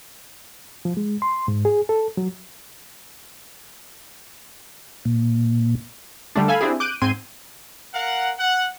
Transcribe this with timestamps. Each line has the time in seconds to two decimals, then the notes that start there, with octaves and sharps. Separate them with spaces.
0.85 F3
0.97 G#3
1.22 C6
1.48 G#2
1.65 G#4
1.89 A4
2.17 F#3
5.05 A#2
6.35 D3 G3 A3 D4
6.48 A4 F5 G#5 B5
6.61 C4 D4 E4 G4 G#4
6.80 D6 F#6 G6 D7 D#7
7.02 G#2 C4 C6 G#6 D#7
7.94 A#4 F5 F#5
8.38 F#5